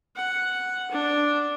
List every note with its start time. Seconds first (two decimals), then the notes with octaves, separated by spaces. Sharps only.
0.16 F#5
0.91 D4